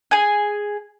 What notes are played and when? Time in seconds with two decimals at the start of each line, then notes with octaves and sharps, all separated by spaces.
0.11 G#4 G#5